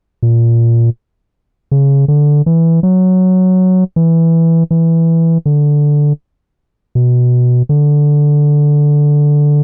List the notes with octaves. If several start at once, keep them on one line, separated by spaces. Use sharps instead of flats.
A#2
C#3
D3
E3
F#3
E3
E3
D3
B2
D3